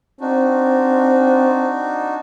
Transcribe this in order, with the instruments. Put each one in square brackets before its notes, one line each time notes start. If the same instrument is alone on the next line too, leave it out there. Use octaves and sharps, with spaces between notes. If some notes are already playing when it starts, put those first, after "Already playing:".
[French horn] C4 [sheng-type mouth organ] D4 D#4 F#4